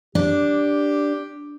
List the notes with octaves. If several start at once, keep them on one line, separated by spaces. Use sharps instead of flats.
D4 G4